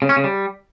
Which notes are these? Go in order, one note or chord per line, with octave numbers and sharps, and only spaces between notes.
C#3
C#4
C#3
G3